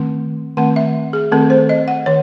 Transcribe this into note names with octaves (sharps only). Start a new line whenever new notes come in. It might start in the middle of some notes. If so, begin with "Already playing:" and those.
Already playing: D#3 A3 C4
D#3 A3 C4 F#5
E5
G#4
D#3 A3 C4 A4
C5
D#5
F#5
D#3 C#5